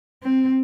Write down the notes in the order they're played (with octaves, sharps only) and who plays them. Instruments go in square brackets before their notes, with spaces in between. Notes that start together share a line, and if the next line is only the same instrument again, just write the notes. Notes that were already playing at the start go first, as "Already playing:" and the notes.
[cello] C4